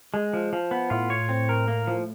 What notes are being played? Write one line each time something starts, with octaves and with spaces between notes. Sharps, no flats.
G#3
F3
F3
B3
A2 F4
C#5
C4
A#4
A#3
F3